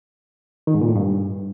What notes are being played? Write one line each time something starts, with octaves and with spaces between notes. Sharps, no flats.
D#3
G#2
A#2
A2
G2